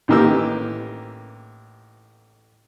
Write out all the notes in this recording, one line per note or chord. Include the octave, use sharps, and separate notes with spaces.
A1 D#3 E3 A#3 G4 E6